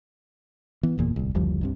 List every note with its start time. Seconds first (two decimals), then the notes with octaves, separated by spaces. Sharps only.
0.83 E3 B3
0.98 F#1 E2 A#2
1.16 D1 C2
1.35 F#1 D2 F3 G3
1.61 C2 G2 C3